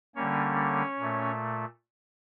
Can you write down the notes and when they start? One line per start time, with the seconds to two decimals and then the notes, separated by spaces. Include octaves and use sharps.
0.16 D3 G3 A#3 C#4 C#5
0.99 A#2 A3